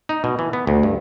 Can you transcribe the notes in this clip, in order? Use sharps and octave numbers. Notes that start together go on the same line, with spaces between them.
D#4
B2
E3
B3
D2
G2